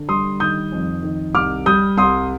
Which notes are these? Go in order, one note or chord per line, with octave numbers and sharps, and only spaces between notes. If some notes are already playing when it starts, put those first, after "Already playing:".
Already playing: D3
G3 C6 D#6
D#3 D#6 G6
F2
D#3
C2 D6 F6
G3 D#6 G6
C2 C6 D#6